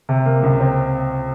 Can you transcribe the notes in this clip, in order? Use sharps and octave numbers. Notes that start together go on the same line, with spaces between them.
C3
A#3
C#2
C4